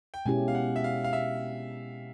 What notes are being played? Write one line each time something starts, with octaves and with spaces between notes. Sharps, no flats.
G5
B2 G#3 C#4 E4 G4 G#5
F5
F#5
E5
F5
F5
E5